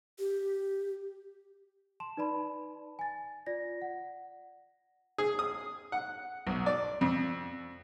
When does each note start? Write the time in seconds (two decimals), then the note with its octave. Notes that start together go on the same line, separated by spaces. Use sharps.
0.19 G4
2.00 A5 C6 E7
2.17 D#4 B4 D5 A5 B5
2.99 G#5 A6
3.46 F4 D5 A#6
3.82 F#5
5.18 G#4
5.39 D#6
5.92 F#5
6.47 B1
6.66 D5
7.01 F2